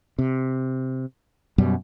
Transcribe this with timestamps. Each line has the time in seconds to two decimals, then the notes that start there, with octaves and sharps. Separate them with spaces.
0.19 C3
1.58 F#2 B2 G3